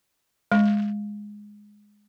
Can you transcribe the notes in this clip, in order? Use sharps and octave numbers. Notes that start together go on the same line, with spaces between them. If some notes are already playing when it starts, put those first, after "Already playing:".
G#3